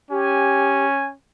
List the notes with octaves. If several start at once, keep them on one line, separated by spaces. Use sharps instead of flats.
C#4 G4 G#5